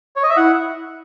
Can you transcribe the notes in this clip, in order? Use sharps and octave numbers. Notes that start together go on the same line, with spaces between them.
C#5
D#5
E5
E4 F#5